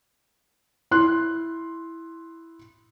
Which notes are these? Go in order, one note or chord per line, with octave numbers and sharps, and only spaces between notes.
E4 C6 F#6